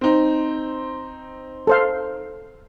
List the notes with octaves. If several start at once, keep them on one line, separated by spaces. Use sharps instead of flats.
C4 D#4
A4 C5 F5